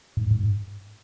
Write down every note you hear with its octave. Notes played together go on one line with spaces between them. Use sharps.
G#2
G#2